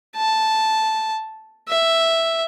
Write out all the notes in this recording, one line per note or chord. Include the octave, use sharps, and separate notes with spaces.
A5
E5